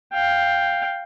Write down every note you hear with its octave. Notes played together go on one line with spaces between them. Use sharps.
F5 G5